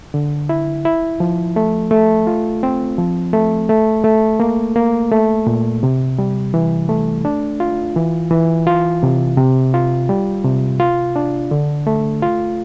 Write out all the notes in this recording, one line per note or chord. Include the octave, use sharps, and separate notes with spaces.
D3
E4
E4
F3
A3
A3
F4
C4
F3
A3
A3
A3
A#3
A#3
A3
A#2
C3
G3
E3
A3
D4
F4
E3
E3
F4
C3
C3
F4
G3
C3
F4
D4
D3
A3
F4